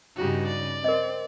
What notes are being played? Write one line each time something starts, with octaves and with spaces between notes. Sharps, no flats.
G2 C#3 D#4 F#4 G4
D5
C4 A#4 D#5